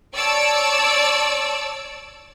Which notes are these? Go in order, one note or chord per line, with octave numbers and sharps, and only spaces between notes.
C#5 D5 A5 E6 D7